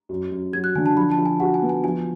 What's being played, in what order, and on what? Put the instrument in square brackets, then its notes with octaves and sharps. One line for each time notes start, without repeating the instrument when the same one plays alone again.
[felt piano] F#2
F#2
[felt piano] F#3 [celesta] G#6
[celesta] F#6
[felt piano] D3 [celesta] G#5
[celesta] A5
[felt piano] F3 [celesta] B5
[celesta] A5
[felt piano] F3
[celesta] G#5
[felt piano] F#4 [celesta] F#5
[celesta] G#5
[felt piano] B3
[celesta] G#5
[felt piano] F3 [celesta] G#5